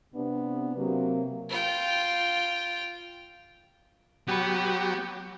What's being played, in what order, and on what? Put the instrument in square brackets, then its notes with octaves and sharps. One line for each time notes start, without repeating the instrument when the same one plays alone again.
[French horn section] C3 B3 D4
C3 F#3 A#3
[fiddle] F4 G5
[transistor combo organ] F#3 G4 [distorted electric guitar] B3 B5